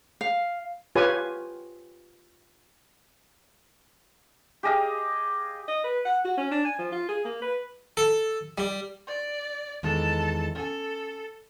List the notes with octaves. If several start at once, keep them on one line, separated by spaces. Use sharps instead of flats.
F5
F4 G4 B4 C#5 G#5
G4 G#4 D#5 F5
D#5
B4
F#5
F#4
C#4
D4
G#5
F3
F4
G#4
A#3
B4
A4
G3
D5
E2 D#3 G#3 A4 A5
C#4 A4 G#5